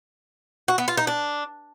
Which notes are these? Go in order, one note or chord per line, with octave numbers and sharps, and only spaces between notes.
F#4
B3
F4
D#4
D4